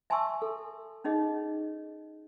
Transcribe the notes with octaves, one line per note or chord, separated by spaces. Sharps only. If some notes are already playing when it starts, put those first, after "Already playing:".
E5 G#5 A5 C6 C#6 E6
A4
C#4 D#4 G#4 D#5